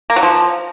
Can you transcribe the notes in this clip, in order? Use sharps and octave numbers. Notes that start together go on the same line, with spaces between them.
A#3
F#3
F3